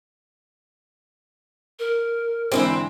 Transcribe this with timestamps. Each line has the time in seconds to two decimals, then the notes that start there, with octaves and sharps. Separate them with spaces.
1.79 A#4
2.52 G#2 D3 E3 C4 D#4 E4